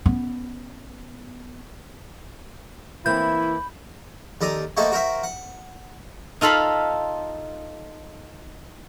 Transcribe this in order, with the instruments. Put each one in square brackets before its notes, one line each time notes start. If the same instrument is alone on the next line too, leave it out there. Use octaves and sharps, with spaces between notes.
[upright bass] B3 C#4
[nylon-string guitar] E3 A#3 C4 [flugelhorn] E4 [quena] B5 [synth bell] G6
[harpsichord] D#2 A4 D5 A#5 D#6
A3 A#3 D#4 F#4 A4 C5
F#4 A#4 C5 E5
F#5
[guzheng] D#4 F4 A4 F5 B5